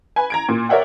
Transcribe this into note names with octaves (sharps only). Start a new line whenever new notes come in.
B4 G#5
A#5 G#6 D7
A#2
A#4 C#5 D5 E5 F#5 G5